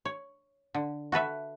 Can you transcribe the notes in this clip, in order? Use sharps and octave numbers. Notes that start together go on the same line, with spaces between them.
C#5
D3
F#4 A4 B4 E5